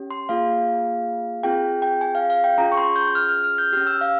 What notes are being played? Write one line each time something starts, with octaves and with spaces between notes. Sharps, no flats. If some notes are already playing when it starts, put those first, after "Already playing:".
Already playing: C#4 G4
C6
A#3 F4 G#4 F5
C4 F4 G#4 G5
G5
G#5
F5
F5
G5
C#4 F4 G#4 A#5
C#6
C6
G6
F6
F6
F6
G6
C#4 G4 F6
E6
F5